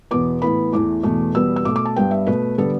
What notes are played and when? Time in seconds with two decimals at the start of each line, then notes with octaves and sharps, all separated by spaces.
0.11 E2 B2 B3 D6
0.42 A2 E3 B3 B5
0.72 E2 E3 A3 D6
1.03 E2 B2 A3
1.34 E2 B2 G3 B3 E6
1.56 E6
1.65 B2 A3 D6
1.76 D6
1.85 A5
1.96 G2 G3 B3 G5
2.11 E5
2.27 B2 A3 B4
2.58 D3 G3 B3 A4